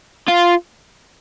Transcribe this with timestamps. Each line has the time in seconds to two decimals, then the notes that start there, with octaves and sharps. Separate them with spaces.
0.28 F4